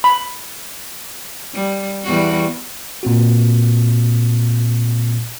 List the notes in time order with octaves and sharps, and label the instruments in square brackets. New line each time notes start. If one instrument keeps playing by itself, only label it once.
[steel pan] B5
[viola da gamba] G3
E2 G3 F#4
[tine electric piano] A#2 C4 F#4